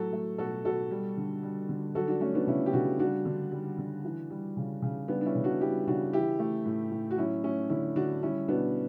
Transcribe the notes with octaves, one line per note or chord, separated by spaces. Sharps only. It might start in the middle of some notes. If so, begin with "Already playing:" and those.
Already playing: A2 F#3 F#4 A4
A3
B2 F#4 A4
B2 F#4 A4
G3
D3
G3
D3
F#3 F#4 A4
D4 F#4
A3 C#4
B3 D4
C#3 C#4 E4
G4
C#3 D4 F#4
G3 D4 F#4
D3
G3
D3
E3
G3
C#3
C#3
G3 B3 D4
D4
C#4 E4
C#3
D4 F#4
G3 E4 G4
C#3 D4 F#4
E3 E4 G4
A3
A2
A2
F#4
F#3 C#4 E4
A3 C#4 E4
D3 C#4 E4
D3 D4 F#4
G3 C#4 E4
B2 B3 D4